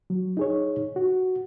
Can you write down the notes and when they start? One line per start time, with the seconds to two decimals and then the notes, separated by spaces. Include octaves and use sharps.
0.10 F#3
0.37 D#4 G#4 C#5
0.96 F#4